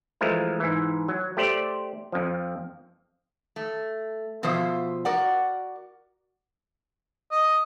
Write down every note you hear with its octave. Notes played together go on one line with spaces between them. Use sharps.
E3 F3 G#3 A3 A#4
G#2 E3
F#3
A3 G4 C5 D5
F2 F3
A3
B2 F3 F4 C5 E5
F#4 A#4 D5 F#5
D#5